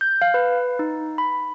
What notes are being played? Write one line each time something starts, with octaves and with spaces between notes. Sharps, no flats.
G6
F5
B4
D#4
B5